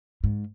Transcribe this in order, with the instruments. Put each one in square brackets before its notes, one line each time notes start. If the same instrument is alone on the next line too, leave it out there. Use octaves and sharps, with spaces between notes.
[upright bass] G#2